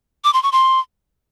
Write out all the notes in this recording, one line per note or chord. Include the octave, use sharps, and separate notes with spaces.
D6
C6
C#6
C6